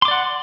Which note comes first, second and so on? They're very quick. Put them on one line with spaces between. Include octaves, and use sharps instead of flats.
C6 D6 D5 F#5